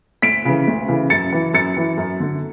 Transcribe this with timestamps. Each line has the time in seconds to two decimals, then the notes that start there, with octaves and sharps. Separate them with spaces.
0.22 D2 B6 D7
0.45 C#3 E3
0.67 D2
0.88 C#3 E3
1.10 F#2 A6 C#7
1.33 E3
1.54 F#2 A6 C#7
1.77 E3
1.97 F#2
2.20 D3